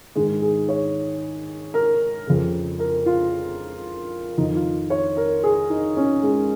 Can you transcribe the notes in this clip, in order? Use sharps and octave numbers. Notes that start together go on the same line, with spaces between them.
G#2 D#3 G#3
G#4
C#5
A#4
F2 C#3
A#4
F4
F2 D#3 D#4
F4
C#5
A#4
G#4
D#4
C#4
G#3